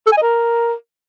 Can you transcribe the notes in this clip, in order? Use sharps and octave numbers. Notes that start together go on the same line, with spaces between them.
A4
G#5
D#5
A#4